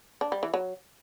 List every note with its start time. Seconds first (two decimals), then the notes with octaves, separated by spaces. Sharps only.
0.21 D4
0.32 G3
0.43 E3
0.54 F#3